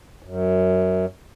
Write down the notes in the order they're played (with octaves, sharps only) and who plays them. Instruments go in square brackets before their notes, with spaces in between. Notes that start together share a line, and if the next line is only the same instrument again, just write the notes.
[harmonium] F#2